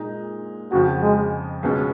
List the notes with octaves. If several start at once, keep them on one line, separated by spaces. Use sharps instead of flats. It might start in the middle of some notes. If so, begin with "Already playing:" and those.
Already playing: A#2 G#3 D#4
F2 C#3 F3 F#4
G#3
C#2 B2 G#3 C#4